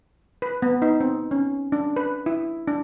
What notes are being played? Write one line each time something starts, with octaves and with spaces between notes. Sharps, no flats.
B4
B3
D#4
C4
C#4
D4
B4
E4
D4